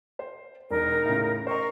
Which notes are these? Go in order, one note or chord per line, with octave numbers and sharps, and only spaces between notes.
C5
E1 D#4 A#4
A2 C#3
A#4 C5 D#5 C#6